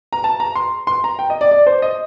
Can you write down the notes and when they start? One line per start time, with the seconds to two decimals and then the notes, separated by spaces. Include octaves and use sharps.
0.13 A#5
0.24 A5
0.40 A#5
0.55 C6
0.87 C6
1.04 A#5
1.19 G5
1.30 D#5
1.41 D5
1.51 D5
1.67 C5
1.82 D#5